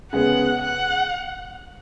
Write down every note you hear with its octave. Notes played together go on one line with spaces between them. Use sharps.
C#3 G#3 B3 F#5
F#5